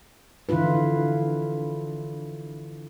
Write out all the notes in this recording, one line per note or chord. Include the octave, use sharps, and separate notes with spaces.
D3 E3 E4 F4 B4